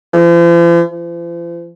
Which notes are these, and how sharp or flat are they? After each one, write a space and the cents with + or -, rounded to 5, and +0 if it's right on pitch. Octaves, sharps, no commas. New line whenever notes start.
F3 -45
F3 -45